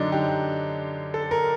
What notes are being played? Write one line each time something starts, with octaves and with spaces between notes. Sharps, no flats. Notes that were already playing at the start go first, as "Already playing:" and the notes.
Already playing: F#2 D3 F#3 D4 D#4
G4
A4
A#4